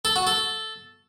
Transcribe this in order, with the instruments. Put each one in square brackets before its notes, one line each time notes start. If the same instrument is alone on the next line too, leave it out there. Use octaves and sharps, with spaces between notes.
[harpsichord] A4
F#4
A4